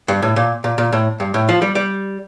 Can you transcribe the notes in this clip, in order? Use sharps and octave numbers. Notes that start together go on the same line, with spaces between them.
G2
A2
A#2
A#2
A#2
A2
G2
A2
F3
G3
G3